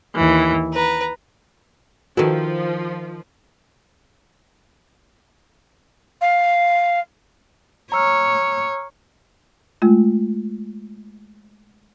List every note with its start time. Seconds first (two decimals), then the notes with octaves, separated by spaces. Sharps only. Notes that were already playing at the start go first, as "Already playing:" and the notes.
0.14 D#2 E3
0.73 B4 A#5
2.17 D#3 F3 E4 F#4 A4 B4
6.21 F5
7.92 C#5 A#5 E6 F6
9.82 G#3 A3 F4